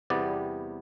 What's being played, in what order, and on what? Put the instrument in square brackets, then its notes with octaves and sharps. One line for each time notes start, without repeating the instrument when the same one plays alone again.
[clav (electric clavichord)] E2 C3 G3 B3 D5